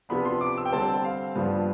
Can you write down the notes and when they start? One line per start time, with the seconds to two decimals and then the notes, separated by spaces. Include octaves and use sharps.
0.09 C3 F3 B3 D4 B5
0.25 C6
0.41 D6
0.57 E6
0.65 G5
0.72 D3 G3 C4 A5
1.04 F5
1.36 G2 F3 B3 D4